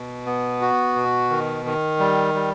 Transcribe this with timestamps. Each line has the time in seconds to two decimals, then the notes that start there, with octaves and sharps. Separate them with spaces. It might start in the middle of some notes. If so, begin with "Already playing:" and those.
Already playing: B2
0.26 B3
0.61 F#4
0.96 B2
1.30 D#3
1.65 D#3
1.99 G3
2.34 G3